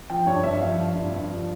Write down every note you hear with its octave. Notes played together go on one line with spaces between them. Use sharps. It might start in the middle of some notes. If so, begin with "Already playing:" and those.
F3 G5
G2 C#5
G2 E5
F3 F5
F3
G2
G2
F3